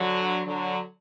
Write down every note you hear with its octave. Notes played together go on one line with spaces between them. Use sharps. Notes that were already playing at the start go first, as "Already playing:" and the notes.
Already playing: D3 F#3
D3 F#3